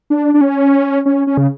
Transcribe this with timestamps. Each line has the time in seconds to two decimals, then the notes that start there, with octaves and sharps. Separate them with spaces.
0.10 D4
0.34 D4
0.41 C#4
1.06 C#4
1.27 C#4
1.37 C#3